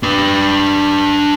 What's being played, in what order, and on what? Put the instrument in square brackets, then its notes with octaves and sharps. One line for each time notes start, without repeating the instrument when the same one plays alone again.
[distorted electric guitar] D4 B4